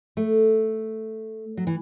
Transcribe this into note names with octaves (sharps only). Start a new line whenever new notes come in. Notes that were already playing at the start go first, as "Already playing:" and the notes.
A3
F#3
E3